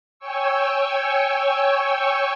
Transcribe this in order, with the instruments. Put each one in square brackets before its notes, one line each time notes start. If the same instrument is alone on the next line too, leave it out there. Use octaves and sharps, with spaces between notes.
[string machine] C#5 G5 G#5 C#6 E6